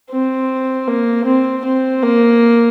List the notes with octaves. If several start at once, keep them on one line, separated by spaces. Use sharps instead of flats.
C4
A#3
C4
C4
A#3